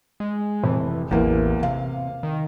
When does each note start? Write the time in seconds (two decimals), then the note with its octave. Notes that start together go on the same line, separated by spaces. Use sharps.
0.20 G#3
0.64 F1 E3
1.11 A1 E2 A#3
1.63 C3 F5
2.23 D#3